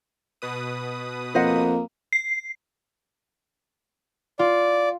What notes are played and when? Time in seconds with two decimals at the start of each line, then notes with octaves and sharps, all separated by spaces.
0.42 B2 B4 D#6
1.35 F2 A#3 C5 D#5 F#5
2.13 C7
4.39 F4 D5